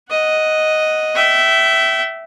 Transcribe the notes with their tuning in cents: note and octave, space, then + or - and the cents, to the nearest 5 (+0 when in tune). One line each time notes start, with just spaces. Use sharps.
D#5 +0 F#5 +0
E5 +0 G5 -35